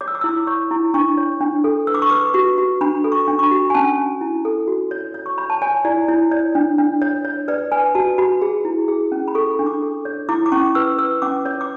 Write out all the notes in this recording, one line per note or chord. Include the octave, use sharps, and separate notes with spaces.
C#5 D6
E6
D6
E4 E6
D6
C#5 C#6
E4
D4 C#6
C#5
D4
A4
B4 E6
D6
C#6
B4 D6
F#4 C#6
F#4
D4 B5
A4
C#6
D4
C#6
B5
F#4
G#5
C#4 A5
C#4
E4
A4
F#4
C#5
C#5
C#6
C#5 B5
A5
C#5 G#5
E4 D5
E4 C#5
C#5 D5
D4
D4
C#5
C#5
B4 D5
B4 G#5
F#4 A5
F#4 B5
G#4
E4
G#4
C#4
B5
A4 C#6
D4
D6
A4
C#5
E4 D6
D6
C#4 C#6
B4 E6
B4 E6
C#4 D6
C#5
D6